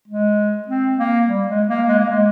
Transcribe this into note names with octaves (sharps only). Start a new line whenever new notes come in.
G#3
C4
A#3
G3
G#3
A#3
G#3
A#3
G#3